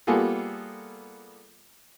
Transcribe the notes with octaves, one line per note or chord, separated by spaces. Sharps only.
G3 A#3 B3 F4 G#4 A4